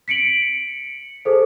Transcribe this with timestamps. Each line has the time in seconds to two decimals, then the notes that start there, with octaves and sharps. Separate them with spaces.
0.08 B6 C#7 D7 F#7
1.25 G#4 A4 C5